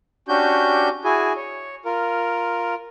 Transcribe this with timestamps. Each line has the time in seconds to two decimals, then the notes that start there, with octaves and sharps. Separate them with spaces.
0.28 C#4 D4 F#4 G4 G6
1.04 E4 F#4 G#4 G#5
1.36 C#5
1.85 F4 A#4